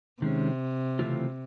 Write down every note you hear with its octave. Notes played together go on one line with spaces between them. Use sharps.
C3 D#3 G#3 C#4
C#3 E3 A3 C4 F4